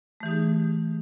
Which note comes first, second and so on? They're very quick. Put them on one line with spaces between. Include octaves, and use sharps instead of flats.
A3 E3 G4 D#4 G#4